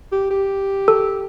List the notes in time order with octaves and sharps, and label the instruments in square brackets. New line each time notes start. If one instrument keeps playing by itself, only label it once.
[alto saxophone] G4
G4
[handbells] A4